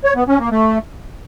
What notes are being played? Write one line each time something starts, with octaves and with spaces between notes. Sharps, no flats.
C#5
B3
C#4
A#3
A3